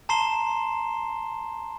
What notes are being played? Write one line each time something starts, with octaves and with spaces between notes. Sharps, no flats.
A5 A#5 C6 C7 E7 G7